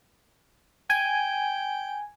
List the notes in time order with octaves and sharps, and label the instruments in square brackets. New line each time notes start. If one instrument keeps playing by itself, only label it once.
[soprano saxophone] G5 [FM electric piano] G#5